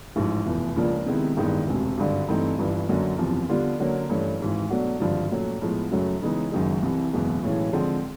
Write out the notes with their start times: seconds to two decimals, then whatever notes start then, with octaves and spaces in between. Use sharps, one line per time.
0.16 A1 G#2 F3
0.46 F1 E2 B2
0.76 C#2 C#3 F3 A#3 D4
1.06 C3 D#3 G#3 B3 E4
1.37 A1 G2 D#3 G#3 B3
1.67 E1 D2 C3
1.98 G#1 G2 D3
2.28 G2 E3 A3 C4 D#4
2.58 G1 G2 E3
2.88 F#2 D3 F#3 A#3
3.18 F#1 E2 C3 F3
3.49 D3 G3 B3 D4 F4
3.79 D3 F#3 A#3 C#4
4.09 G2 E3 A3 C#4
4.40 G#1 G#2 E3
4.70 B2 F#3 A3 D4 F#4
5.00 G#1 G2 D3 F3
5.31 A#2 F#3 A3 C#4
5.61 A2 F3 G#3 B3
5.91 F#2 C#3 F#3 A3
6.22 C#3 E3 G#3 B3 D#4
6.52 F#1 F#2 D#3 G#3
6.82 C2 C3 E3
7.13 F#1 E2 B2 G#3 B3
7.43 B1 A2 E3 G#3 C#4
7.73 D3 F3 G#3 C4